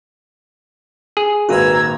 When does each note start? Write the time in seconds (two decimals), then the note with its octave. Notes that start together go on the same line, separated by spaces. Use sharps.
1.17 G#4
1.49 G#1 A#2 F#4 B4 A#5 E6 G#6 D#7